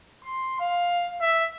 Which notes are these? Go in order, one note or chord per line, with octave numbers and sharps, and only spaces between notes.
C6
F5
E5